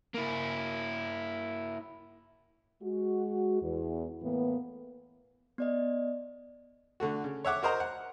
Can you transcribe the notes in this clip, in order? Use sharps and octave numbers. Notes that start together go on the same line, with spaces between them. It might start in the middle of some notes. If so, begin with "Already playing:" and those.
A#3 E4
G#3 F#4
E2
A2 E3 A#3 B3
B3 D5 D#5
D3 A3 F#4
C#3
C#5 E5 F#5 D6
F#4 A#4 C5 D#5 A#5
F#5